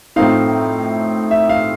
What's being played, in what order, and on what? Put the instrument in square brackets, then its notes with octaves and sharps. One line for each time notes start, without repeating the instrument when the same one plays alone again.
[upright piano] A2 F3 A3 C4 D#4 [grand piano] F5
[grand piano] E5
F5